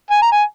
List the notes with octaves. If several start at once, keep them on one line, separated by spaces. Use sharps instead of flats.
G#5
A#5
G#5